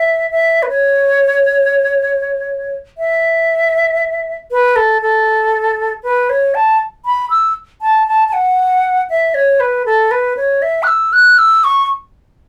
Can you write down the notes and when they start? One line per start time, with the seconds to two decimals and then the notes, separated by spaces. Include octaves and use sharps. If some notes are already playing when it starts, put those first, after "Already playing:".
Already playing: E5
0.31 E5
0.63 B4
0.69 C#5
2.98 E5
4.51 B4
4.76 A4
5.02 A4
6.03 B4
6.30 C#5
6.55 A5
7.06 B5
7.30 E6
7.82 A5
8.07 A5
8.28 A5
8.33 F#5
9.10 E5
9.34 C#5
9.60 B4
9.86 A4
10.11 B4
10.37 C#5
10.62 E5
10.83 F#6
10.88 E6
11.13 F#6
11.38 E6
11.64 C#6